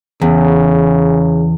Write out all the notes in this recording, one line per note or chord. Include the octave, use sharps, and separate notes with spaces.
E2 C#3